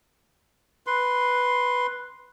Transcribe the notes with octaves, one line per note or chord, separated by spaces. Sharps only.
B4 C6